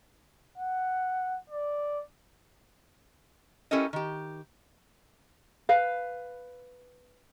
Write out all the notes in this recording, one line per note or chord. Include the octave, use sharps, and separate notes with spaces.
F#5
D5
C#4 E4 G4 A4 A#4 D#5
D#3 G4
B4 F5